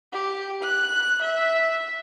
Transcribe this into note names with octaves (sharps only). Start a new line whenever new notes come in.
G4
F#6
E5